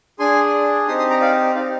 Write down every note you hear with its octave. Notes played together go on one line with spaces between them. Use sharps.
D4 G#4 G#5 C6
C4 D#4 G4 C6 D#6
C6 D#6
A#5 D6
D5 F5
C4 D#4 G4 D5 F5